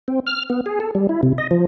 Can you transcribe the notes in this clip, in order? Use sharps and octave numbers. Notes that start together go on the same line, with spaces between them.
C4
F6
B3
G#4
A4
G3
E4
C3
D#5
F3